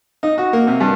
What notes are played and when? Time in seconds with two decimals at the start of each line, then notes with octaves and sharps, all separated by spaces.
0.23 D#4
0.38 F#4
0.53 A#3
0.67 C3
0.80 G2